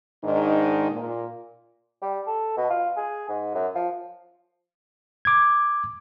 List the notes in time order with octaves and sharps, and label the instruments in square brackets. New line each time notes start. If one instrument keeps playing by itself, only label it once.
[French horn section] G#2 D#3 D4 D#4
A#2
[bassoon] G3
A4
B2
F4
G#4
G#2
F#2
F3
[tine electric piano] D6 G#6